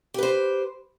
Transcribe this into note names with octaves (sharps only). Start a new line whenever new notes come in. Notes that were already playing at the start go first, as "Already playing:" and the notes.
G4 B4 C5